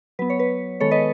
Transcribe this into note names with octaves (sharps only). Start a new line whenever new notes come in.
F#3 B3 B4
C#5
B4
D#3 G#3 B3 A4 C#5
B4 D#5